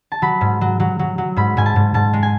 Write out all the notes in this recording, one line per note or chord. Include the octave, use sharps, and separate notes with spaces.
A5
F#3 B5
G#2
F#3
F#3
F#3
F#3
G#2 B5
G#2 G#5
A5
G#2
G#2 A5
G#3
G#5